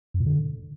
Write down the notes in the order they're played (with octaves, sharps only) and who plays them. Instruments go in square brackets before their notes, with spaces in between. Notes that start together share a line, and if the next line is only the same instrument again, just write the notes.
[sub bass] F#2
A#2
D3